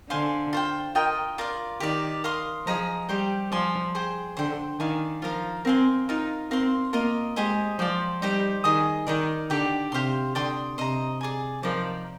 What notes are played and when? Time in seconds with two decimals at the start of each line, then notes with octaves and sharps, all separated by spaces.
0.10 D3 C5 F5 G#5 C6
0.53 F4 C5 G5
0.95 F4 A#4 D#5 G5
1.38 F4 A#4 D5 F5
1.80 D#3 G4 A#4 D5
2.24 A#4 F5 C6 D#6
2.66 F3 G#4 D#5 A#5
3.09 G3 G4 C5 G5
3.52 F3 D5 G#5 C6
3.95 G#4 C5 G5
4.37 D3 C5 G5 C6
4.79 D#3 D5 F5 G#5
5.22 F3 F4 A#4 F5 A#5
5.65 C4 A#4 F5 G#5 C6
6.08 D#4 F4 A#4 F5
6.51 C4 A#4 F5 C6
6.93 A#3 F4 A#4 D#5
7.36 G#3 G4 C5 D#5 G#5
7.79 F3 D5 G5 C6
8.21 G3 D#4 G4 C5
8.64 D#3 G#4 D#5 G#5 D#6
9.07 D#3 D#4 A#4 D5
9.50 D3 G4 D5 G5
9.92 C3 G4 C5 F5 C6
10.35 D3 D5 G5 C6 D#6
10.78 C3 C5 D#5 A#5
11.21 G#4 D5 G#5
11.63 F3 D#4 A#4 D5